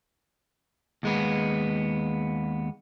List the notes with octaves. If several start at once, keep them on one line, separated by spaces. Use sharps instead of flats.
D#2 G#3 B3